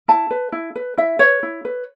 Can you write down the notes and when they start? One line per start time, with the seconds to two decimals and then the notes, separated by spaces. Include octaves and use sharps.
0.08 E4 A5
0.31 B4
0.52 E4
0.76 B4
0.98 E4 E5
1.19 B4 C#5
1.43 E4
1.65 B4